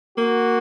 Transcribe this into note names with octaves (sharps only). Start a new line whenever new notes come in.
A#3 F#4